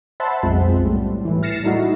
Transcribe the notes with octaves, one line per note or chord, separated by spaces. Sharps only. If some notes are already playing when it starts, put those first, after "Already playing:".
C5 E5 F#5 A5 B5 C6
B1 F2 G#3 C4
A2 G3
A2 E3
F6 A6 A#6 C7 C#7 E7
G3 A3 D#4 E4 F#4